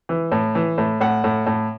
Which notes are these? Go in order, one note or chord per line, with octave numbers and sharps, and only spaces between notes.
E3
A2
E3
A2
A2 F#5
A2
A2